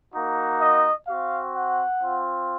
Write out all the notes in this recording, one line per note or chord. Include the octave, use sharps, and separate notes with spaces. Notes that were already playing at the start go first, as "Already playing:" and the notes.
A#3 D#4 F#4
D#5
C4 F#4 F5
F#5
C4 F4